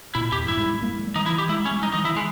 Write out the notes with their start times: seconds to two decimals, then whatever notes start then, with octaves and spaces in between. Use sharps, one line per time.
0.15 A#2 E4
0.32 E2 G4
0.48 G2 E4
0.57 G#2
0.66 G3
0.74 G#3
0.82 A#3
0.99 G#3
1.08 G3
1.16 E3 D#4
1.26 E4
1.32 E3
1.38 G4
1.49 G#3 E4
1.60 G#3
1.65 C#4
1.71 G#3
1.82 G3 D#4
1.93 E3 D#4
2.05 D#3 E4
2.16 E3 G#3